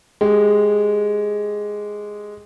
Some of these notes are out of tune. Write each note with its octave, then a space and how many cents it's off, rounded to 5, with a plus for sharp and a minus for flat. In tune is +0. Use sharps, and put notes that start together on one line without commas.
G#3 +0 G4 +0